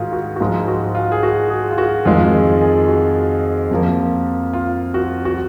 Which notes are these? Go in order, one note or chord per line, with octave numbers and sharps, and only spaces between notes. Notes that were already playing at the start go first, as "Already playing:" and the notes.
Already playing: G#2 D#3 F4 F#4 G#4
F#4
F#4
G#2 F3 G#3 F4
F#4
F4
G#4
F#4
G#4
F4
F#4
F2 D#3 G#3 F4
G#4
G#4
F#4
F2 F3 A#3
F4
F#4
F#4